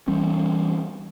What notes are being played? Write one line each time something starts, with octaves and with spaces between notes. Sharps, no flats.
E3 G3 C4 C#4